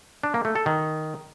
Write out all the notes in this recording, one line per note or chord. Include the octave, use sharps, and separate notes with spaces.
D4
A#3
A3
A4
D#3